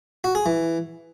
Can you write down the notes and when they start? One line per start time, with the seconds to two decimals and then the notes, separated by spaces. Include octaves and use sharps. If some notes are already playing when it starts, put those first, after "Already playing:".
0.24 F#4
0.35 G#4
0.46 E3